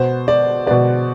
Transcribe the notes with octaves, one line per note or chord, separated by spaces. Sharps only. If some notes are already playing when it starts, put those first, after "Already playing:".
Already playing: B2 B3 C5
D5
B2 B3 D5